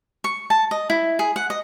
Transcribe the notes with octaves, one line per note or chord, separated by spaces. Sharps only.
C#6
A5
D#5
E4
G#4
F#5
D#5